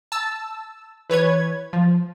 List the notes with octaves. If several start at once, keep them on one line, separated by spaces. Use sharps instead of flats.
A5 E6
E3 B4 C#5 G#6
F3